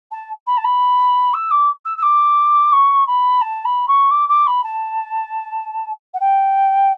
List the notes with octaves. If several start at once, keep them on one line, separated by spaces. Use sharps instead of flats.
A5
B5
A5
B5
E6
D6
E6
E6
D6
C#6
B5
A5
B5
C#6
D6
D6
B5
A5
F#5
G5